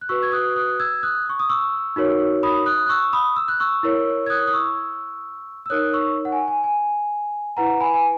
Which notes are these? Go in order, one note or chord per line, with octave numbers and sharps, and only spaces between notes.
F#6
F#4 B4 C#6 E6
G#6
D#6 F#6
D#6 F#6
E6 G#6
D#6 F#6
C#6
D#6
C#6 E6
D#4 F#4 A#4 C#5
B5 D#6
D#6 F#6
F#6
C#6 E6
B5 D#6
E6
F#6
C#6 E6
E4 A#4 C#5
G#6
D#6 F#6
D#6
C#6 E6
E6
D#4 A#4 C#5 D#6 F#6
C#6 E6
F#5
G#5
G#5
G#5
E4 B4 F#5 A#5
G#5 B5
G#5